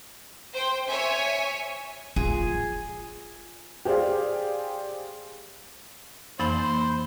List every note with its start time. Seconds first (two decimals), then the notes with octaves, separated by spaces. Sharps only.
0.54 C5 G5
0.87 C#5 E5 G#5
2.16 F4 G#4
3.85 G4 G#4 C5 D5 F5
6.40 F2 E3 A#3 C5 B5